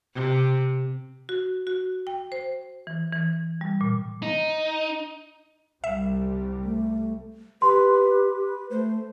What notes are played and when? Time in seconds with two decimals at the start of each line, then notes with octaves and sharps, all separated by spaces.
0.14 C3
1.29 F#4
1.67 F#4
2.07 G5
2.32 C5
2.87 E3
3.13 E3
3.61 G3
3.81 A#2
4.23 D#4
5.84 C2 C3 G3 E5
6.64 A3
7.62 G4 B4 C6
8.70 A3 C5